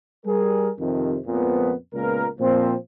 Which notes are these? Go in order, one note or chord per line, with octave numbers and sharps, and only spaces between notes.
G3 G#4 A#4
F2 C3 D#3
F2 A#2 F3 G#3 B3
C#2 A#2 A#3 B3 A#4
A#2 F3 C4